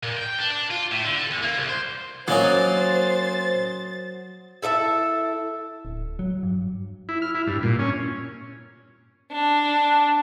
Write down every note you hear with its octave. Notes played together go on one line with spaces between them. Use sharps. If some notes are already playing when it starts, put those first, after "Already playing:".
A#2
G5
D4
D4
F4
A2
D3
A4
E2
A#3
C2
C5
F#3 A#3 C#4 D#4 C5 A6
E4 A4 D#5 E5
D1
F#3
G2
E4
F6
E4
G2
A#2
C#4
D4